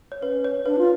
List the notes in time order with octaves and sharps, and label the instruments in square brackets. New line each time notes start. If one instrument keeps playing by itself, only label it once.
[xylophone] C#5
[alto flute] C#4 [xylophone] B4
[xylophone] C#5
[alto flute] D4 [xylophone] B4
[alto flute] F4